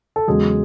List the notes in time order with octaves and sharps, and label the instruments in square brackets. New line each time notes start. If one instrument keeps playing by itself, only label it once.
[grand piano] A4
E2 C#3 F#3 G#3 G#4